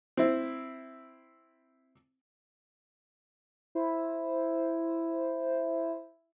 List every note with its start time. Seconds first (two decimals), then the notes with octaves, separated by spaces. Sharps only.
0.17 C4 E4
3.75 E4 C5